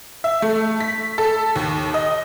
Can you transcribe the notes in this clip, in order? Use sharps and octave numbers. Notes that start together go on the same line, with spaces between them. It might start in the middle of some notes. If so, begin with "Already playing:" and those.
E5
A3
B6
A4
D#2
D#5